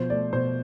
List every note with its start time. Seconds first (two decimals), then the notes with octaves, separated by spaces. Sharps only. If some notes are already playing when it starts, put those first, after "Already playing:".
Already playing: B2 F3 C5
0.10 A3 D5
0.33 B2 C5